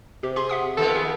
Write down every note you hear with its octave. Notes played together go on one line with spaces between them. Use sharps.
C3 G4
G4 G#4 C6
E5 F#5 D#6
D#3 F3 B3 A4
G#4